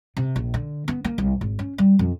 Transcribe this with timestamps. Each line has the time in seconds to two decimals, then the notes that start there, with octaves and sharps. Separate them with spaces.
0.17 C3
0.36 A#1
0.54 D3
0.88 B3
1.04 A#3
1.18 C2
1.41 G#1
1.59 C#4
1.78 G3
1.99 F2